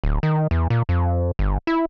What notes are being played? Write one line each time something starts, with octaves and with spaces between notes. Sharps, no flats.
D1
D#3
E2
A#2
F2
G1
E4